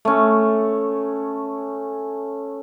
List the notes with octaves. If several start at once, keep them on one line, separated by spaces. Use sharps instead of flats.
A3 C#4